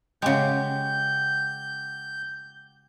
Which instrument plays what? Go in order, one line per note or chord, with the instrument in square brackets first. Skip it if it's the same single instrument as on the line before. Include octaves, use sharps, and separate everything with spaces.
[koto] C#3 G#3 [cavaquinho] F#4 G4 [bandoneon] G6